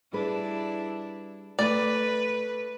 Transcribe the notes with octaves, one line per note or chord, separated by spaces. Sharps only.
G3 D4 E4 G#4 B4
A3 B4 D5